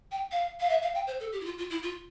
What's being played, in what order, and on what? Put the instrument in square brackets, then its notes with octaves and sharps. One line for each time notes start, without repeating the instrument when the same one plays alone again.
[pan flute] G5
F5
F5
E5
F5
G5
C5
A4
G4
E4
F4
F4
E4
F4